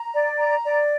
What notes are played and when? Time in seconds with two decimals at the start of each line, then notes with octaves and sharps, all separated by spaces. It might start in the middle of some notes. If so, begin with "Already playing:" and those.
Already playing: A#5
0.13 D5
0.38 A#5
0.64 D5